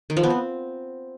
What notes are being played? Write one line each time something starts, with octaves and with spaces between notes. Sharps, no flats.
D#3
F3
B3
C4